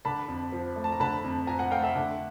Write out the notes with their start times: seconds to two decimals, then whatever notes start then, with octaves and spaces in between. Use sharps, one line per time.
0.05 D3 A5 B5
0.28 F2
0.52 F3
0.76 A3
0.84 A5
0.92 A#5
1.00 D3 A5 B5
1.24 F2
1.47 F3 G#5 A#5
1.59 F#5 G#5
1.71 A3 F5 G5
1.83 E5 F#5
1.95 D3